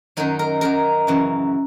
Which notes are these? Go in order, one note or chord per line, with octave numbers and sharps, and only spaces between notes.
F#2 D#3 F#3 D#4
A#4
F#2 D#3 F#3 A#4
F#2 C#3 E3